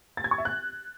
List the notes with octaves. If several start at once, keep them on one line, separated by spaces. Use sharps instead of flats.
A6
G#6
C#6
E5
F#6